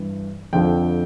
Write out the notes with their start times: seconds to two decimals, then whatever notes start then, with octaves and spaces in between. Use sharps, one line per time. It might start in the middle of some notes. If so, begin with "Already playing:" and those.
Already playing: G2 E3
0.53 F2 D3 F3 C4 G5